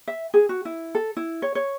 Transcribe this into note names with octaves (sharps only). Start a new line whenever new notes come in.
E5
G#4
F#4
E4
A4
E4
C#5
C#5